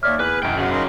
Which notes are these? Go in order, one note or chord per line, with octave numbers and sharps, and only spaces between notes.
D#2 C#5 D5 E5 D6 F6
E2 G#4 B4
E1 F#2 E3 F#5 G5
C#3 F#3 F#4
D#4 A#4 C6